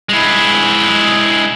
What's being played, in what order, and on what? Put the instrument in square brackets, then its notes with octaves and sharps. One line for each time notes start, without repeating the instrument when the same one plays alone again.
[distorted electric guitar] G#3 E4